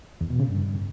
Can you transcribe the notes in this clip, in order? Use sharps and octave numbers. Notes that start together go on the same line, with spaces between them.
E2
B2
C#3
G2